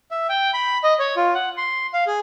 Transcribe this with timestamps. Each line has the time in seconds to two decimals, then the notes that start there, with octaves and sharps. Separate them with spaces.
0.11 E5
0.29 G5
0.54 B5
0.83 D#5
0.99 C#5
1.16 F4
1.35 F#5
1.57 C6
1.94 F5
2.07 G#4